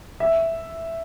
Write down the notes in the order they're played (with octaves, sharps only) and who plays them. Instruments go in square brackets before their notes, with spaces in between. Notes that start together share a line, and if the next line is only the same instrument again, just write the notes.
[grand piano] E5